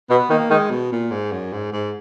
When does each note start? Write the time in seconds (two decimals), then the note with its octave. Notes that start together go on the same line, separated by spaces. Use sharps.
0.10 B2 B3
0.30 D#3 A#3
0.50 D#3 G#3
0.71 B2
0.92 A#2
1.11 G#2
1.32 F#2
1.53 G#2
1.72 G#2